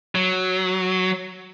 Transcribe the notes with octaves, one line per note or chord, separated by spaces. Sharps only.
F#3